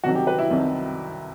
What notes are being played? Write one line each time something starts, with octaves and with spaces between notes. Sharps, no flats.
C2 C3 D#3 F#3 F#4
G4
B4
E4
C2 C3 D#3 F#3